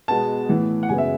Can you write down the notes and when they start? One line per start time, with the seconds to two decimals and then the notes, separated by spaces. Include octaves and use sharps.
0.08 B2 G#3 B3 A5
0.49 A2 E3 B3
0.83 F#5
0.89 F#2 C#3 G#3 B3 G#5
0.98 E5